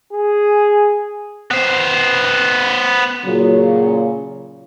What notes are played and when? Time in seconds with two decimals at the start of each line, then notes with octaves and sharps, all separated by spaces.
0.12 G#4
1.51 B3 C5
3.26 A#2 C#3 F#3